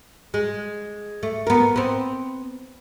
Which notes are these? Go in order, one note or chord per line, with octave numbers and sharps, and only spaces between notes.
G#3
A3
B3 A#4
B3 C4